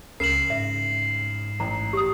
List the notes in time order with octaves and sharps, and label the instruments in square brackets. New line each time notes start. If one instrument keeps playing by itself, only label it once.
[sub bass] C#2 [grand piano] C#3 [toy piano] A#4 [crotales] C7 E7 F#7
[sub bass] G#2 [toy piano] E5
[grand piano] A1 [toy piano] A#5
[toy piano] G4 D#6